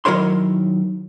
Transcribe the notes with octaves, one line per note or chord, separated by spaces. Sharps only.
D#3 F#3 E4 A#4 C#5 C6